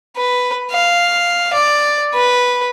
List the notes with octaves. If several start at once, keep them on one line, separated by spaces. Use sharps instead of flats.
B4
F5
D5
B4